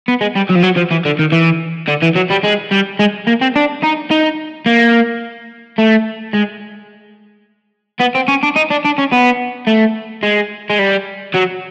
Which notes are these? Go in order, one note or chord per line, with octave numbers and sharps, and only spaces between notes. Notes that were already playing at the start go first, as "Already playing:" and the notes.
B3
G#3
G3
F#3
F3
F#3
F3
E3
D3
D#3
E3
D3
E3
F#3
G3
G#3
G3
G#3
A#3
C4
D4
D#4
D#4
A#3
A3
G#3
B3
C4
C#4
D4
D#4
D4
D4
C#4
B3
A3
G#3
G#3
G3
F#3